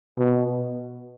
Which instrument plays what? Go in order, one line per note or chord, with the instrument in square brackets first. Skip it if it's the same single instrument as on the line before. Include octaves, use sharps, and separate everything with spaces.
[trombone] B2